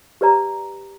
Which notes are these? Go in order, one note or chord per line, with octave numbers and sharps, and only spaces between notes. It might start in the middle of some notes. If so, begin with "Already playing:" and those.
G4 B4 D5 A#5